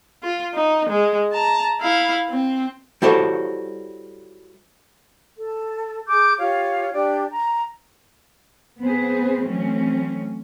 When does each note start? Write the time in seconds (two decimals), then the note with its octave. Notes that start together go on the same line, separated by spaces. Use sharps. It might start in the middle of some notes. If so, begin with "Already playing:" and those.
0.23 F4
0.54 D#4
0.89 G#3
1.32 A5 A#5
1.80 E4 F5
2.30 C4
3.02 G3 E4 F#4 A4 C5 C#5
5.37 A4
6.07 G#4 D6 G6
6.39 F4 G4 C#5 F5
6.93 D4 G4 D5 G5
7.31 A#5
8.81 B3 C4 G#4 B4 C5
9.42 E3 F#3 A3 C4 C#4